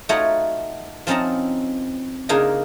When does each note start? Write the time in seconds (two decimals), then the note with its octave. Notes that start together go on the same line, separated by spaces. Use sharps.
0.09 A3 D#4 F4 F#4 C#5 F#5
1.07 F3 C4 C#4 D#4 A5 A#5
2.29 C#3 A#3 D4 D#4 F4 G#5